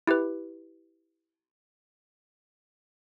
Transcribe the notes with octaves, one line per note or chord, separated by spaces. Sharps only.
E4 G4 B4